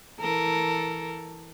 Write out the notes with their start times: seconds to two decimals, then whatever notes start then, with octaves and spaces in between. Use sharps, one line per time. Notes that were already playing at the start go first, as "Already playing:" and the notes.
0.20 E3 A4 A#4